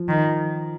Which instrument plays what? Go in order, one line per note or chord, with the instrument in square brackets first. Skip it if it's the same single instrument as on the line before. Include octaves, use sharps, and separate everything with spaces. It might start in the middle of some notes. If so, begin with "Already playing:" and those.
Already playing: [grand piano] F3
[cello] D#3